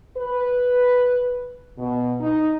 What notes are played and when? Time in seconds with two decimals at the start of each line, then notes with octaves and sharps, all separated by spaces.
0.17 B4
1.78 B2
2.20 D#4